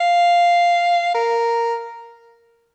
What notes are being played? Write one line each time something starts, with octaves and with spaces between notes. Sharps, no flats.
F5
A#4